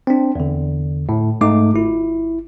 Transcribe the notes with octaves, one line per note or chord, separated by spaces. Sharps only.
C4 D4
E2 D3
A2
G#2 A3 D#4 D6
G1 E4